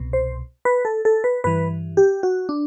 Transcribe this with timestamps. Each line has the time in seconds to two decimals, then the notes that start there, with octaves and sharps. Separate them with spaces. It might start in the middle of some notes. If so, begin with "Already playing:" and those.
Already playing: C2 B2
0.13 C5
0.65 B4
0.85 A4
1.05 A4
1.24 B4
1.44 G2 E3 B4
1.97 G4
2.23 F#4
2.49 D4